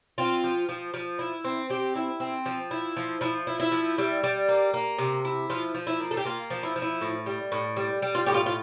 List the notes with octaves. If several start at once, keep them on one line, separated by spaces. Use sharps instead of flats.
C4 F4
F3
F3
F3
E4
C4
C4 G4
E4
C4
F3
E4
F3
F3 E4
E4
E4
F3
G3
G3
A#3
A#3
C3
E4
F3 F4
F3
E4
A#3
A4
G4
A#3 F4
F3
E4
F3
E4
A2
G3
A2
G3
G3
F4
A2 G4
F4
F4